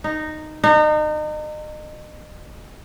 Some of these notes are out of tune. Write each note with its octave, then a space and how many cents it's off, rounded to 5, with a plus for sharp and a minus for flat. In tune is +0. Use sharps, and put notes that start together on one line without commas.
D#4 -10
D#4 -35